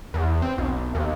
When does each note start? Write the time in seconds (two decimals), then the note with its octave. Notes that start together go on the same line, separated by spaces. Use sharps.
0.14 E2
0.42 C4
0.58 B1
0.95 D#2